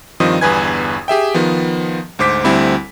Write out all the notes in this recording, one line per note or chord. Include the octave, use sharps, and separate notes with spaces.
G2 D#3 F3 C4 D#5 D#6
G1 E2 G2 B4 G#5 G#6
G4 G#4 E5 G5
D#3 F3 B3
D2 G#2 C5 D6 B6
D2 G3 C4 E4 B5